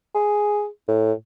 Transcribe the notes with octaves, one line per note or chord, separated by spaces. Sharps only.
G#4
A2